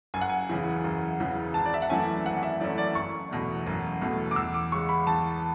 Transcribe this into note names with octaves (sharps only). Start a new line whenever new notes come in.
F#1 G#5
F#5
G#5
E2 C#3 E3
F#1
E2 C#3 E3
G#1 A5
D5
E5
F#5
F#2 E3 A3 C#4 G#5
G#1 F#5
E5
F#2 E3 A3 C#4 D5
D5
F#1 C#6
E2 B2 A3
F#1
E2 B2 A3
D6
E2 E6
D6
C#3 G#3 C#6
B5
E2 A5